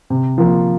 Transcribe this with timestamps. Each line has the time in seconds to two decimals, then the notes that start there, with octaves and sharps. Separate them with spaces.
0.10 C3
0.38 F3 A#3